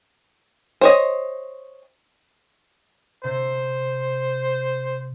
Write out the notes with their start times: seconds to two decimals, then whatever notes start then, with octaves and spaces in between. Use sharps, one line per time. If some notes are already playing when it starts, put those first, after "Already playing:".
0.81 C5 C#5 D#5
3.24 C3 C5